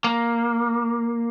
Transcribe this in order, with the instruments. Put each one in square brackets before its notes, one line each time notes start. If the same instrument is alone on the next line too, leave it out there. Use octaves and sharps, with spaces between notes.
[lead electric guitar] A#3